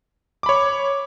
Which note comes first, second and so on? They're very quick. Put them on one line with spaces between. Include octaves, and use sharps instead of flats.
D6 B5 C#5